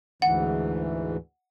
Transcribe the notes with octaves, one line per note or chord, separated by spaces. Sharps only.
D2 G#2 E3 F#5